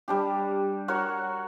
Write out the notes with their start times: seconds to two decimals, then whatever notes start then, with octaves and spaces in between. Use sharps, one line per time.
0.08 G3 D4 G4
0.88 F#4 A#4 C#5 C#6